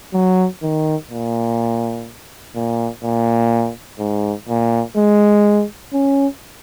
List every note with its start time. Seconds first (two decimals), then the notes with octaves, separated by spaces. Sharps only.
0.13 F#3
0.62 D#3
1.11 A#2
2.55 A#2
3.03 A#2
3.99 G#2
4.49 A#2
4.97 G#3
5.93 C#4